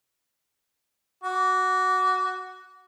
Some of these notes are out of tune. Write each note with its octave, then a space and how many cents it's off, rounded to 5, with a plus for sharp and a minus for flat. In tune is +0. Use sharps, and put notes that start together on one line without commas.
F#4 +0 D6 -30